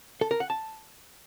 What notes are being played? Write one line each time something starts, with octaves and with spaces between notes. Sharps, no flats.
A4
A#4
F#5
A5